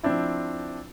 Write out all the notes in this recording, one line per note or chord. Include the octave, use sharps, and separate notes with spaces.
F3 C4 D4 E4